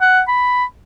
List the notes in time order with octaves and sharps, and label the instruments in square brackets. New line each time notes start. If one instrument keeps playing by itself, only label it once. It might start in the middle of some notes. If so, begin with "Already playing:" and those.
[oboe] F#5
B5